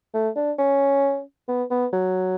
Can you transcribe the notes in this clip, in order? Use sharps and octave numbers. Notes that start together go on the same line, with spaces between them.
A3
D4
C#4
B3
B3
F#3